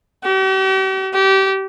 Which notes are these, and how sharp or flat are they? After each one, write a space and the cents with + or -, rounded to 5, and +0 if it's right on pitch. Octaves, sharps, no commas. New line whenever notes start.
G4 -45
G4 -25